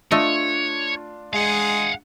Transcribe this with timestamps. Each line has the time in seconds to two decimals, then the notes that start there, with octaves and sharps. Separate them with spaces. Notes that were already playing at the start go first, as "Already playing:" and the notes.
0.11 A3 D4 F4 C#5 D#5
1.33 G#3 G#4 F5 F#5